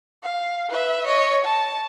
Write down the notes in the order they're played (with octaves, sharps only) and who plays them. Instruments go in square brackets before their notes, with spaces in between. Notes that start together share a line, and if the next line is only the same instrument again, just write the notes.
[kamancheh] F5
B4 E5
C#5 D#5
A5